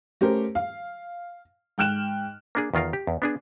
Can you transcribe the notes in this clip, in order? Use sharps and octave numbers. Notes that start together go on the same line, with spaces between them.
A3 C#4 G4 A#4 C5
F5
G#2 G5 F6 F#6 E7
A#3 D4 G#4
E2 D#3 F4 A#4 F5
G4
E2
B3 D4 G#4